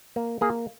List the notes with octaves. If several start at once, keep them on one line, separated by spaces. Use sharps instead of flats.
A#3
A#3 G#4